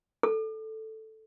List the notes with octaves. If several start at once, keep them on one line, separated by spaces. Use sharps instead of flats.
A4